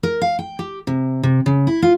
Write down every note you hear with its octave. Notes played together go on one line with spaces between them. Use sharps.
A#4
F5
G5
G4
C3
C3
C#3
E4
F4